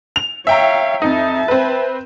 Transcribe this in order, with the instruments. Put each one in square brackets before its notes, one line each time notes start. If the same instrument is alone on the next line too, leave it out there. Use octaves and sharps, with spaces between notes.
[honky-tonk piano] F7
[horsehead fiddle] C#5 F5 [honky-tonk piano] E5 G5 A#5
[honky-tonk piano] F2 D#4 [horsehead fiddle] E5 A5
[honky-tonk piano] C4 B4